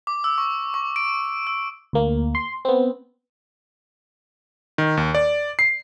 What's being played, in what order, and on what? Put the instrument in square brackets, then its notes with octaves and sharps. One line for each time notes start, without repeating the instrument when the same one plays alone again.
[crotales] D6
E6
C#6
C#6
D7
E6
[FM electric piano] D2 A#3
C6
B3 C4
[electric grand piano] D#3
D#2
D5
C7